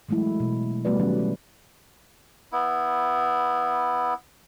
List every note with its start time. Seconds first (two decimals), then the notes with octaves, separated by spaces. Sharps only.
0.09 E3 F#3 G#3 A3 E4
0.40 B2
0.85 G3 A3 B3 F#4 B4 D5
1.00 D#3 F#3 A3 C#4
1.19 F#3
2.52 B3 E4